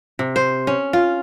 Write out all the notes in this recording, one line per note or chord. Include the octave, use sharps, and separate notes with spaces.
C3
C5
C#4
F4